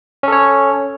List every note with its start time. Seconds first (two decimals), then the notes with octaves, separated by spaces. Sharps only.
0.23 C#4
0.28 A4
0.32 C#5